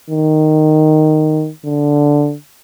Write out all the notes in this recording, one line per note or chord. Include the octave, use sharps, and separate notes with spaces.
D#3
D3